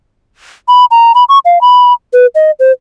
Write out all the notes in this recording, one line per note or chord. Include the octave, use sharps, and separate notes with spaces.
B5
A#5
B5
C#6
F5
B5
B4
D#5
C5